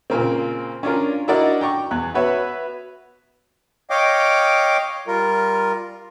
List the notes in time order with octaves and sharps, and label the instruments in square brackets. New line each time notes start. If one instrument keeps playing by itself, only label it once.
[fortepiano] A#2 C#3 A#3 C4
C#4 D4 F4 A#4
D4 E4 F#4 A#4 D5 D#5
G5 A#5 C#6 D6
E2 F#6
B3 F#4 B4 C#5 E5
[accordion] C#5 D#5 F5 G5 D6
G3 F4 A#4